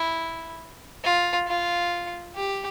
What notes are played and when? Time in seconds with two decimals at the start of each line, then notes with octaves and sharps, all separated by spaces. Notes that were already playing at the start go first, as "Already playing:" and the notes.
Already playing: E4
1.04 F4
1.47 F4
2.36 G4